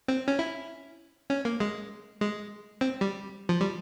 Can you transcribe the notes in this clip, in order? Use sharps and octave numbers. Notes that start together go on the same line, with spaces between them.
C4
C#4
E4
C#4
A#3
G#3
G#3
C4
G3
F3
G3